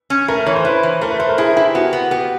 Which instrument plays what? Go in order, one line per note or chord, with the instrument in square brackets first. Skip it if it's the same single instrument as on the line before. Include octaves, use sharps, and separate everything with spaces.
[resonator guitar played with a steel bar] C#4
[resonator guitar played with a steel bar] A3 [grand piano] A#4
[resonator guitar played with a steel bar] E3 [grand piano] C#5
[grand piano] C5
[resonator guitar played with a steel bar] E4 [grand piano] B4
[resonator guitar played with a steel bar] E3
[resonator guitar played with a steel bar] A3 [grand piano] A#4
[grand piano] B4
[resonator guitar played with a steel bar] A3 [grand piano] C5
[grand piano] A#4
[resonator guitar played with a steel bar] E4 [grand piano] G#4
[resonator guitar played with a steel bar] E4 [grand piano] G4
[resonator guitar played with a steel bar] B3 [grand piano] F#4
[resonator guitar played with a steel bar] B3
[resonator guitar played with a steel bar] B3 [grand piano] G4